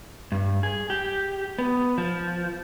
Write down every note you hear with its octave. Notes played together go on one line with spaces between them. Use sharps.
G2
G#4
G4
B3
F3